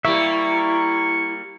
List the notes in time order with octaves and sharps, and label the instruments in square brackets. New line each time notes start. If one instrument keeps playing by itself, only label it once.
[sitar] G3 A#3 [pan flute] E4 [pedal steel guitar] E5 [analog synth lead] C#6